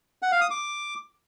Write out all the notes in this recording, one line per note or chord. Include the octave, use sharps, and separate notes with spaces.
F#5
F5
D#6
D6